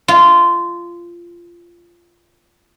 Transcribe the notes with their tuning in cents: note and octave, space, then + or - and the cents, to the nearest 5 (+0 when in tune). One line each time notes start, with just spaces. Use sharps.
F4 -15